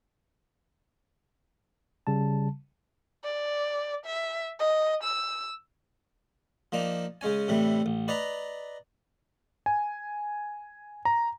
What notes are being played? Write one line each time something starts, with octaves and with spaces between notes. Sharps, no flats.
C#3 G3 A5
D5
E5
D#5
E6
F3 A#3 D4 D#4
C#3 G#3 C#4 G#5
A2 C3 E3 G3 A3
A1
B4 D5 D#5 A#5 B5
G#5
A#5